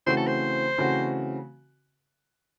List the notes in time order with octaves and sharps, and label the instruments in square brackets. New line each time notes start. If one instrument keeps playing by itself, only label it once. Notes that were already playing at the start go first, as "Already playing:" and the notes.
[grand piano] C#3 E3 A3 C4 F#4 [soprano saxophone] C5
[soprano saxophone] A4
C5
[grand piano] C#3 E3 A3 C4 F#4